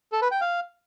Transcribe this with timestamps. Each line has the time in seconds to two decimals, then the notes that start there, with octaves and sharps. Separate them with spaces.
0.12 A4
0.22 B4
0.31 G5
0.41 F5